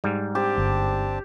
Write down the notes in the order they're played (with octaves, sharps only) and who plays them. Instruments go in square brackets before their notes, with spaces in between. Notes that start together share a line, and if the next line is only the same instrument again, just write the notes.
[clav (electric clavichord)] G#2 G3
[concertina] C4 D4 A5 [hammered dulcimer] G4
[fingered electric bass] G1